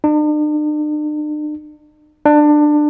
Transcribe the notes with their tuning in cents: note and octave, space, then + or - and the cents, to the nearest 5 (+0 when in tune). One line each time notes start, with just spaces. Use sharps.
D4 +45
D4 +20